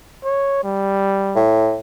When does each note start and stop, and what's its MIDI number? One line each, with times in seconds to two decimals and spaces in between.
0.24 0.60 73
0.64 1.43 55
1.36 1.79 45